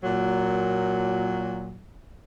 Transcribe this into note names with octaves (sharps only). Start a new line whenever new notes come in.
A#2 F#3